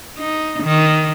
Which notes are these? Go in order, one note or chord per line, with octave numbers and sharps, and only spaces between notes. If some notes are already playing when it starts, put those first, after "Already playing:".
D#4
D#3